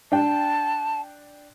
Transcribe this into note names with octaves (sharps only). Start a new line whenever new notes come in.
D4 G5 A5